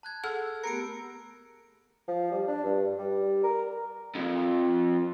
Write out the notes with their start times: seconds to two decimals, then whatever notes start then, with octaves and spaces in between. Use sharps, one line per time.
0.03 A5 F#6 G#6
0.24 G#4 A4 F#5 E6
0.64 A3 B3 G4 A#4 C#7 D7
2.08 F3
2.32 G3
2.48 D4
2.64 G2
2.98 G3
3.44 A#4
4.15 F2 F3